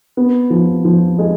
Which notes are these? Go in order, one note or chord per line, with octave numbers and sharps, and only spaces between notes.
B3
F3
F3
G#3